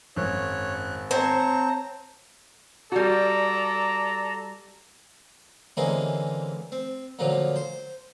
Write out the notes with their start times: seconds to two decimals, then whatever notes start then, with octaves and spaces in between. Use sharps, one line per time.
0.16 G#1 F#2 C#5 F#6
1.11 C4 C5 C#5 A5 A#5
2.92 G3 F#4 A4 D5 A#5
5.77 D3 E3 G#3 A#3 C4 C#4
6.72 C4
7.19 A#2 D3 F3 F#3
7.56 C5